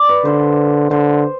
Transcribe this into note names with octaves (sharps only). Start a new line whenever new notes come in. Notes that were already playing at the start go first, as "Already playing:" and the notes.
Already playing: D5
B4
D3 C5
D3 C5